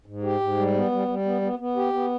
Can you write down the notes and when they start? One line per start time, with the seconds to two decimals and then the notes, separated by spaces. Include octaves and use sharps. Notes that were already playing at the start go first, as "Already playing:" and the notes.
0.06 G#2
0.23 G4
0.40 G#2
0.56 G3
0.74 B3
0.91 G3
1.08 G3
1.25 B3
1.41 B3
1.59 B3
1.76 G4
1.93 B3